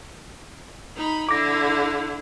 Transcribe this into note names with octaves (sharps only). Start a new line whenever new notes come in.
D#4 B5
D3 E4 D6 A#6